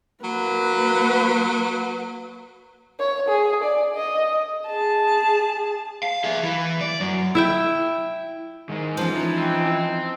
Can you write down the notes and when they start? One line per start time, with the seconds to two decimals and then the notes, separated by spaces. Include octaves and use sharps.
0.24 F#3 A#3 B4
2.99 C#5
3.28 G#4
3.63 D5
3.95 D#5
4.67 G#4 A5
6.03 F5
6.24 G#4 E5
6.43 E3
6.81 D5
7.00 F#2
7.35 E4 E5 G5
8.69 G#2 D#3 G#3
8.97 E3 F3 C#4
9.15 E3 D#4
9.38 C4